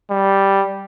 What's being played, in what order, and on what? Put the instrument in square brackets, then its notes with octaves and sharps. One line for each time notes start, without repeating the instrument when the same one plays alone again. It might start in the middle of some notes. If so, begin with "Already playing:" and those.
[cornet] G3